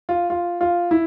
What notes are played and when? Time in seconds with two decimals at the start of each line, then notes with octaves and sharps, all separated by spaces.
0.09 F4
0.30 F4
0.61 F4
0.91 E4